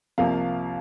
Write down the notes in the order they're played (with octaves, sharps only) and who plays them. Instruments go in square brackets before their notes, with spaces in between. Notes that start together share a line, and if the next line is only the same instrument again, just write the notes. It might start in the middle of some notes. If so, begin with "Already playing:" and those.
[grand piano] C2 C3 F3 A#3 F5